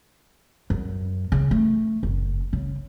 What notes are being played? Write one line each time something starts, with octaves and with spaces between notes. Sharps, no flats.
F#2
C#3
A3
F#1
C#3